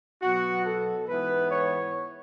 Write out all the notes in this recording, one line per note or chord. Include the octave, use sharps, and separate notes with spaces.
B2 F#3 B3 F#4
A4
G#2 E3 B3 B4
C#5